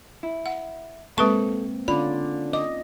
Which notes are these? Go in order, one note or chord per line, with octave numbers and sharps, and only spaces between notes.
E4
F#5
G#3 A#3 C4 A4 B4 A5 C#6
D3 C#4 F4 D5 B5
D#5 D6